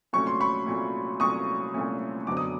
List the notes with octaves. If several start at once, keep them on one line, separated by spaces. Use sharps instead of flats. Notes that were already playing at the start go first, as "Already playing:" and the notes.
C2 A#2 F#3 A3 C#4 C#6
C6
B5 C#6
C2 A#2 F#3 A3 C#4
C2 A#2 F#3 A3 C#4 C#6 D#6
C2 A#2 F#3 A3 C#4
F#1 F#2 D3 F#3 B3 D6
D#6